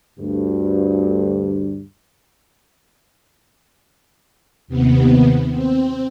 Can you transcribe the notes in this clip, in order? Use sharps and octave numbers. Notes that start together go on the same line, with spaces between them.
D2 G2
D#2 C3 B3
C4